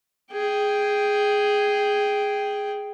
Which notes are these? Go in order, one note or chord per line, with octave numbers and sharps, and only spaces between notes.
G#4 G5